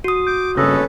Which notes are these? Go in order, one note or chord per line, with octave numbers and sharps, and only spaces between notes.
F#4 D#6
D6 G6
G2 C#3 C#4 A4 B4 D#6 E6 A#6